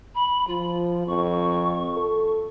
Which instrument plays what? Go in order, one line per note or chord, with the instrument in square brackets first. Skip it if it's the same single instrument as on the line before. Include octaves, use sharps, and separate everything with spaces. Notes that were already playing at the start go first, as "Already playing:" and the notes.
[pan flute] B5
[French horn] F3 [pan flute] F4
[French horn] F2 [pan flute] C#6
[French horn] A4